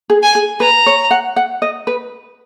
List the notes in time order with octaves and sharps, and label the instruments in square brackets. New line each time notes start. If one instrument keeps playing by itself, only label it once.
[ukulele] G#4
[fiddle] G#5
[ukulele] G#4
[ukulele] B4 [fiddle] A#5
[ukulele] C#5
F#5
F#5
D#5
B4